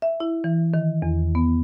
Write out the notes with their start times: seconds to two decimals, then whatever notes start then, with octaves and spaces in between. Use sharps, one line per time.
0.02 E5
0.20 E4
0.44 E3
0.74 D#3
1.02 E2
1.35 B3